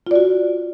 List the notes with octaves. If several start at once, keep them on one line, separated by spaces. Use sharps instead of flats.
F4 F#4 D5